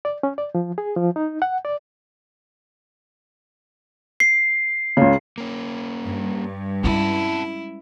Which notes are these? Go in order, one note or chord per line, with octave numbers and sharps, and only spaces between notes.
D5
C#4
D5
F3
G#4
F3
D#4
F#5
D5
C7
C#2 C#3
A#3 C#4
G2
G#3 C4 C#4 E4 F#5 A5